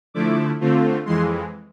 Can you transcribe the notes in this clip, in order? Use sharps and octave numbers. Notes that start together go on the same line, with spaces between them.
D3 F3 A3 E4 D6
D3 A3 C4 F4
F2 E3 G#3 C6